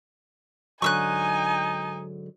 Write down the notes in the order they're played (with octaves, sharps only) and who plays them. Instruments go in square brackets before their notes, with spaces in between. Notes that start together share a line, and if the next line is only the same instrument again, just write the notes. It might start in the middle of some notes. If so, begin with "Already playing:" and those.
[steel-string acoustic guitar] G#2 D3 F#3 [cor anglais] D#4 [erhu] G#5 [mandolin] C#6 E6 F#6